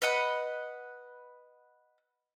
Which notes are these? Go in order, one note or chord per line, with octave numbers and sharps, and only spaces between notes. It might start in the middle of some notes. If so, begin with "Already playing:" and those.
B4 D#5 F#5 B5